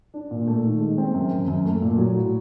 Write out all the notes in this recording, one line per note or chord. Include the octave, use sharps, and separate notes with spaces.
D4
A#2
A3
D#3
G#3
C4
F#2
F#2
F#2
A3
A#2
F#3
A2